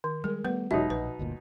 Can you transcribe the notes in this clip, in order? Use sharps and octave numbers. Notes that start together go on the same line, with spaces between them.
D#3
G3 G#3 A#4
G3 A3 B3 B4
E1 B2 F#3 G#3 D#4 E5
A#1 B4
G1 D2 A#2